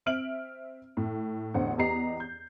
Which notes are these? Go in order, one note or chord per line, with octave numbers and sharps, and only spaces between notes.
C4 E5 F6 D7 F#7
A2
A1 E2 D3 C5 F#5
E2 B3 G4 D#5 A#5 C7
G6